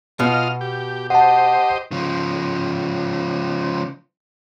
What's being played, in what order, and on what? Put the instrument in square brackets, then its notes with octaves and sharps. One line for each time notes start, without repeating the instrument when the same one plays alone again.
[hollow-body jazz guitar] B2 [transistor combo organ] F4 D#5 F6
[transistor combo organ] G4
[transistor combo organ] G4 C5 D#5 [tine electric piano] F#5 A5
[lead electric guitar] C#3 F3